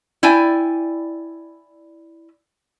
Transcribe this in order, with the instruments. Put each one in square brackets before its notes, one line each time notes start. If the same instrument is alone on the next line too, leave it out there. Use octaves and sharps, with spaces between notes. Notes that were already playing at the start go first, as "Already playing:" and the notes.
[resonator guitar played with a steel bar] E4 D5 G5 G#5